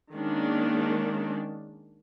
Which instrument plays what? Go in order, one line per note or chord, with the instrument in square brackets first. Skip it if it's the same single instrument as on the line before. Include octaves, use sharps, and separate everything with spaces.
[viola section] D#3 G#3 A#3 C#4 D4